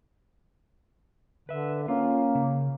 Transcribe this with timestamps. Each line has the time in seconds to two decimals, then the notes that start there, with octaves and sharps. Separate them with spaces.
1.49 D3 B4 E5
1.88 A#3 C#4 F4
2.35 C#3